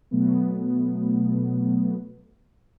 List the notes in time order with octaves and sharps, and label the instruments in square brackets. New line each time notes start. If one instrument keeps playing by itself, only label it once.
[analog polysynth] B2 F#3 A3 B3